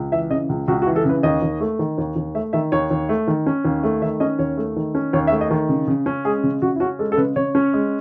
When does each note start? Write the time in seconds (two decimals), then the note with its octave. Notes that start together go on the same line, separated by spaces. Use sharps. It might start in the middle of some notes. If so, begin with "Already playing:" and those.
Already playing: C#2
0.12 E3 E5
0.30 C#3 D#5
0.49 C#2
0.68 C#2 F#4
0.82 F#4
0.87 E3
0.96 A4
1.05 C#3 B4
1.23 D#2 D#5
1.42 D#2
1.60 A3
1.79 D#3
1.98 D#2
2.16 D#2
2.35 A3 E5
2.53 D#3 E5
2.72 D#2 C#5
2.91 D#2
3.09 A3
3.27 D#3
3.47 C#4
3.65 D#2
3.83 A3
4.02 D#3 E5
4.20 C#4 D#5
4.39 D#2 C#5
4.57 A3
4.76 D#3
4.95 C#4
5.13 D#2 C#5
5.27 E5
5.32 A3
5.41 D#5
5.50 D#3
5.69 C#3
5.87 C#3
6.06 C#4
6.25 G#3 G#4
6.43 C#3
6.62 C#3 F#4
6.76 E4
6.80 C#4 F#4
6.99 G#3 A4
7.12 A4
7.17 C#3 B4
7.36 C#3 C#5
7.55 C#4
7.73 G#3